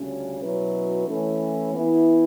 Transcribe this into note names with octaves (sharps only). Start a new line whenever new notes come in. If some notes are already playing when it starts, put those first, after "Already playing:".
Already playing: D2 C#3 G3 C#4
B2 F#3 C#4 E4 B4
E3 A3 C#4
E3 B3 E4